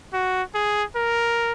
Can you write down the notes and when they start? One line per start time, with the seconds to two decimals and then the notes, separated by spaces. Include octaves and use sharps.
0.13 F#4
0.55 G#4
0.96 A#4